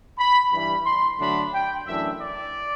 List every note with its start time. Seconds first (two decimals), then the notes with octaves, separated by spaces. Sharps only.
0.18 B5
0.51 G2 E3 G3 B5
0.84 C6
1.19 D3 F#3 A3 D4 B5
1.52 G5
1.86 F#2 E3 A3 D4 E5
2.20 D5